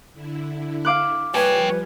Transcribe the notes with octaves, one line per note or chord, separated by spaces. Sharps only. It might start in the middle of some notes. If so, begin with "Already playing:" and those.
D3 E4
F5 D6 F#6
F3 G3 B4 C#5 G5 G#5